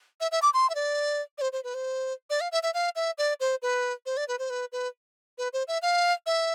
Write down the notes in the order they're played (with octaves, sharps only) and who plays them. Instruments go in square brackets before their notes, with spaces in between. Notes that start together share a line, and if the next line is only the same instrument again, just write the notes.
[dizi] E5
E5
D6
C6
E5
D5
D5
C5
C5
B4
C5
D5
F5
E5
E5
F5
E5
D5
C5
B4
C5
D5
B4
C5
B4
B4
B4
C5
E5
F5
E5